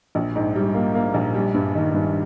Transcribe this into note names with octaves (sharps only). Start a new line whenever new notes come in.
A#1
G#2
G3
A#3
A#3
A#1
G3
G2
D#3
G2